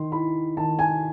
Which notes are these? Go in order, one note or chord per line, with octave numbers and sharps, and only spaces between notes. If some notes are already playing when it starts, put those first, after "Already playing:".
Already playing: D#3 C6
E4 B5
D#3 A5
G#5